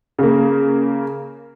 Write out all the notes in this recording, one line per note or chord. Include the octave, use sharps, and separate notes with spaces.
C#3 A#3